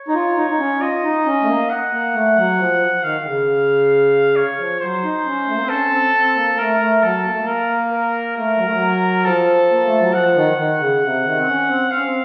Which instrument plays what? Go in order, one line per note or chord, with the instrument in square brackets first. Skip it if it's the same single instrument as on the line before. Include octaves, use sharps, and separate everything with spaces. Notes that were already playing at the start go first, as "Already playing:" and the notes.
Already playing: [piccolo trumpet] C#5
[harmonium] D#4
F4
D#4
D#4
C#4
[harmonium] F4 [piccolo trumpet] D#5
[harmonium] D#4
C#4
A3
A#3
[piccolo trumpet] F#5
[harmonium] A#3
A3
F#3
F3
[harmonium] D#3 [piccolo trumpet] F5
[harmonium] D#3
C#3
[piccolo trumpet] C#5
[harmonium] F3
[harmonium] F#3 [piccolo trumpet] C5
[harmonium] D#4
C#4
A3
A#3
C4
[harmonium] C#4 [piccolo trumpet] A4
[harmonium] C4
C4
A#3
A#3
[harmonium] A3 [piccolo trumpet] A#4
[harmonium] A3
[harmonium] F#3 [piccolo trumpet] A4
[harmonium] A#3
A3
A#3
[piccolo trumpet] A#4
A#4
[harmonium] A3 [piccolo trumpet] A#4
[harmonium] F#3
A3
F#3
[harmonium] F3 [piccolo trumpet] A4
[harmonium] A#3
A3
F#3
[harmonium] F3 [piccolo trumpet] F#5
[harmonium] D#3
D#3
C#3
C3
D#3
C4
C#4
C4
[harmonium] C4 [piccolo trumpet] F5
[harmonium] C#4
C4